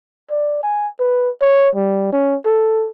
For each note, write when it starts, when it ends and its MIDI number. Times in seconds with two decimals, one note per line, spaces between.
0.30 0.62 74
0.63 0.88 80
1.00 1.30 71
1.42 1.70 73
1.76 2.10 55
2.13 2.36 61
2.46 2.89 69